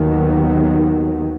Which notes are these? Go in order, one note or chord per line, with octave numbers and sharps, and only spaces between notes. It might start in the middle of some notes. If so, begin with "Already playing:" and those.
Already playing: D#2 D#3 F#3 B3